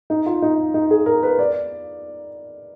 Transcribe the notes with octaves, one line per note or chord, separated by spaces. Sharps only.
D#4
F4
D#4
D#4
G#4
A#4
B4
D5